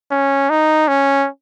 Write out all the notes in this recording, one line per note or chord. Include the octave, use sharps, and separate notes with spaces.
C#4
D#4
C#4